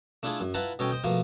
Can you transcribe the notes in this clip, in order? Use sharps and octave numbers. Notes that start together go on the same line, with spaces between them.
A3 D4 E4 F4 G#4 A4
F#2
E4 F4 B4 F#5 A5 A#5
B2 C#4 A4 C#5 D#5 G5
C5 D#5 G5
B2 F3 A3 A#3